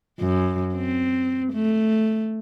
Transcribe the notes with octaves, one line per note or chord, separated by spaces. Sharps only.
F#2
C4
A3